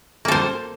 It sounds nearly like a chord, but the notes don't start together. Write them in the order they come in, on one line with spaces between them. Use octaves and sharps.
A#3 A4 C5